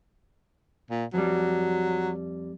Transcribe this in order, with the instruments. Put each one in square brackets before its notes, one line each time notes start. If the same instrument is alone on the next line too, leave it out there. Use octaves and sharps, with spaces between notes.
[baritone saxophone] A#2
[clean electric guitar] F2 G3 [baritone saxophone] F#3